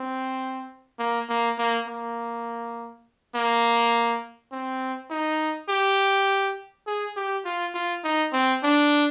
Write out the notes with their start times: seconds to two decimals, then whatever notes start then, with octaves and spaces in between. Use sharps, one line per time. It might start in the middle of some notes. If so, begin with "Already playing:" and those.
Already playing: C4
0.99 A#3
1.30 A#3
1.59 A#3
1.88 A#3
3.35 A#3
4.53 C4
5.10 D#4
5.69 G4
6.87 G#4
7.17 G4
7.45 F4
7.74 F4
8.04 D#4
8.33 C4
8.64 D4